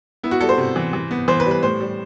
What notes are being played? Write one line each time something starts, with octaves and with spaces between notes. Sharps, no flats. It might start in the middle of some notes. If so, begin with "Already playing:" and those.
B3 E4
F#4
G3 A4
C5
C3
E3
E3
B3
E3 C5
B4
G3
B4
A2 C5
G3